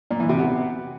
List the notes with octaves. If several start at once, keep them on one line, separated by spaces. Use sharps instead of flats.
A#2
E3
C3
B3